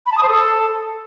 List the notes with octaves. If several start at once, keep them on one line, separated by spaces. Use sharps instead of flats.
B5
A5
D#6
C5
A4